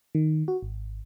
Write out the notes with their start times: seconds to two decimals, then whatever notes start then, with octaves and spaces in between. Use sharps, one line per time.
0.15 D#3
0.48 F#4
0.62 G#1